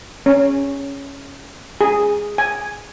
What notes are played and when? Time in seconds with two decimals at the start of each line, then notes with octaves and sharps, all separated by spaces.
0.26 C#4
1.81 G#4
2.38 G#5